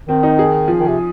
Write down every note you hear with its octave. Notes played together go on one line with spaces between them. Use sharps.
D#3 C4
D#4
G#4
F3
D#3
C3